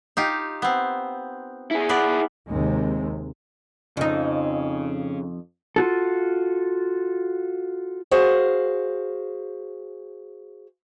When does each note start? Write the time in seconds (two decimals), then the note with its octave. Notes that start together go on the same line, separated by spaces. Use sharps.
0.17 D#4 F4 G4
0.62 B3 C4
1.71 E4 G#4
1.89 B3 B4 D5
2.48 D#2 C3 G#3
3.97 F2 C#3 D#4
5.76 F4 F#4 A4
8.11 F#4 G#4 C5 F5